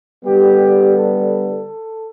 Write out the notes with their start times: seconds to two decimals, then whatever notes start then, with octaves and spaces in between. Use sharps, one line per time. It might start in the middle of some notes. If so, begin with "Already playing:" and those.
0.24 D3 G3 B3 G4
0.94 A4